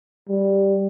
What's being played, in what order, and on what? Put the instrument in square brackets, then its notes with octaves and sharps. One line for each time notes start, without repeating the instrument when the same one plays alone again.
[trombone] G3